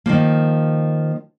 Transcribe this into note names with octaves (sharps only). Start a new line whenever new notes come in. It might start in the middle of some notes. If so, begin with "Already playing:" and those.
D#3 F3 A#3